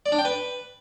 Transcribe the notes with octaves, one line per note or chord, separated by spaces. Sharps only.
D5
D4
G5
B4